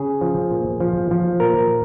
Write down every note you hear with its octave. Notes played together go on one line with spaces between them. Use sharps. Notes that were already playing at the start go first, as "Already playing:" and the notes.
Already playing: C#3 G#4
F3
A#2
F3
F3
A#2 A#4